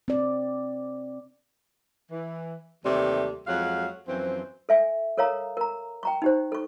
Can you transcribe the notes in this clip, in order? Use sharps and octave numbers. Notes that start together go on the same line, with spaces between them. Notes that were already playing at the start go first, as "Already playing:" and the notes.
C4 D5
E3
D#2 C3 E3 G3 A3
F2 F#3 G#3 F5 F#5
F#2 E3 F3 C4
A4 E5 G#5
A4 A#4 C#5 F5 A#5 D#6
A#4 A#5
G5 A#5 C#6
D#4 G4 C5
A4 C#6